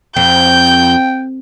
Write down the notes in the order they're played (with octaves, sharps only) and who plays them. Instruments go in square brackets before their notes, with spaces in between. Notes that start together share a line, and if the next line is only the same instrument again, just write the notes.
[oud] F2 [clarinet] G5 [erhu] G6